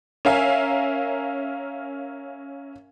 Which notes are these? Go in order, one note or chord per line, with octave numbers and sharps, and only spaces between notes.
C#4 A#4 E5 F5 G#5